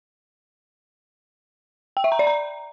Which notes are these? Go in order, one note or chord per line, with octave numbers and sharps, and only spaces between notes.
G5
E5
A#5
D5
A#5